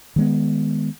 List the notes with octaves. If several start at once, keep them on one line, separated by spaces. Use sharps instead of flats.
D#3 G#3 B3